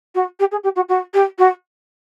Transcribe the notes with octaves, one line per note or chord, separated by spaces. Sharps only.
F#4
G4
G#4
G4
F#4
F#4
G4
F#4